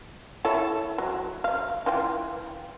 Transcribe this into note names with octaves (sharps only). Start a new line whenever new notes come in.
E4 A4 C#5
F#3
F5
E3 F4 G5